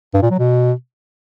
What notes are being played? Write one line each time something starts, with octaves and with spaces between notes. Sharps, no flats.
G2
A#2
F#3
B2